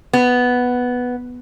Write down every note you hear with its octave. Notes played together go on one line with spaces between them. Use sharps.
B3